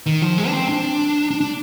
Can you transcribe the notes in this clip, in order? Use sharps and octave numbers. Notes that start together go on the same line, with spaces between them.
D#3
F3
G#3
D4
C4
D4
D4
D4